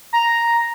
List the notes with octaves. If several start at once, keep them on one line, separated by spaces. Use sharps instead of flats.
A#5